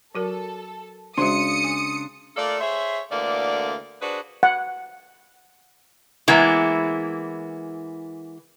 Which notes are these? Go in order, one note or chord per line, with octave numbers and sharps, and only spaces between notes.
F#3 F#4 A4 A#4
C#3 G#3 D4 F#4 C5 C6 D#6 C#7
G#5
A3 A#3 F4 A4 D5
G#4 C5 C#5 E5
D2 D3 E3 A#3 D5
D4 F#4 G#4 B4 C5 D5
F#5
E3 G#3 A#3 B3 E4